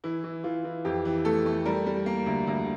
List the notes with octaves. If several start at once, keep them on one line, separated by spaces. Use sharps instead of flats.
E3 E4
E3
E3 F4
E3
F2 G4
E3
A3 A4
A3
G3 A#4
G3
A#3
D2
D2